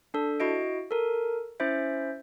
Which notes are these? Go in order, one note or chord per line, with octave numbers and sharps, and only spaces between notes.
D4 A4
E4 F#4 D#5 D7
A4 A#4
C#4 E4 C5 E5